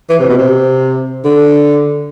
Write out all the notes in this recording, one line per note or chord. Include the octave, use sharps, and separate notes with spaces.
E3
C3
B2
C3
D3